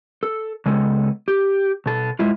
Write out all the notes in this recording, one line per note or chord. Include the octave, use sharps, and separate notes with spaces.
A4
C#3 G#3 B3 A4
G4
B2 A4
G#3 E4 F4